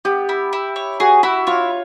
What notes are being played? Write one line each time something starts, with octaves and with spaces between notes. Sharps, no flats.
B3 G4
E4
E4
C#5
F#4 G#4
E4 F#4
F4 C#5